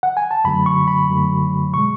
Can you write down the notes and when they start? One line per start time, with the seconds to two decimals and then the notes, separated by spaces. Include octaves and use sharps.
0.03 F#5
0.17 G#5
0.31 A5
0.44 F#2 D3 F#3 A3 B5
0.66 C#6
0.88 B5
1.09 F#2 D3 F#3 A3
1.74 B2 G#3 C#6